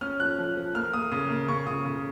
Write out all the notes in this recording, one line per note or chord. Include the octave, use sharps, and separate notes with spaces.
C#4 F6
F3 F#6
F3
F3
A#3 F6
A#3 D#6
C#3 D#6
A#3
C#3 C#6
C#3 D#6
C#3